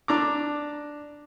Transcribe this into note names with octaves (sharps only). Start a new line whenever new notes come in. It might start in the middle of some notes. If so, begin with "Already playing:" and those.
D4 A#5 D6